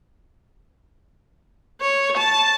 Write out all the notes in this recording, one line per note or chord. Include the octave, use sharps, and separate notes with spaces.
C#5
A5